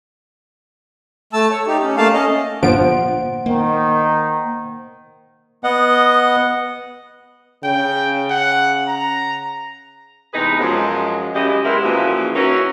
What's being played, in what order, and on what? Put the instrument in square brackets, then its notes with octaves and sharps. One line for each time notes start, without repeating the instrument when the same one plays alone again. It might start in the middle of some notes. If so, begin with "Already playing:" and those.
[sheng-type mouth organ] A3 A5 E6
C#5
D#4 G4
C#4
A3 A#3 F5 A5
C#4 D#5
[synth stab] G1 F3 D7 [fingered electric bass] A#2 [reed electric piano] C5 F#5
[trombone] D#3 [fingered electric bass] A#3
[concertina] B3 D#5 F#5
[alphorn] C#3 [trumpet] G5
[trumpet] F#5
A#5
[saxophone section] E2 C3 G#3 D#4 G#4 B4
F#2 F3 G#3
F#2 C#3 G#3 E4 G4 D#5
G#3 B3 C4 E4 G4 A#4
A#2 C#3 E3 F3 F#4 E5
C#4 D#4 E4 F#4 A#4